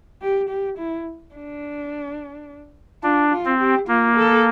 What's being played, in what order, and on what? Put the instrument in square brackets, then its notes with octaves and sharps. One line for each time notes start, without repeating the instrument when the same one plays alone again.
[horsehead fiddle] G4
G4
E4
D4
[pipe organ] D4 [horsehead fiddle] F4
[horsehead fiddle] F4
[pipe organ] C4
[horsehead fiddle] G4
[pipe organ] A#3 [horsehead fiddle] F4
[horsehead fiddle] A4